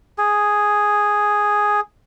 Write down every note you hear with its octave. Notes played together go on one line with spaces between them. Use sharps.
G#4